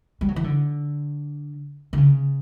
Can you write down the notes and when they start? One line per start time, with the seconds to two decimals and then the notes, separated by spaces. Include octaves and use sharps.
0.21 G3
0.28 F#3
0.36 E3
0.44 D3
1.93 D3
1.98 C#3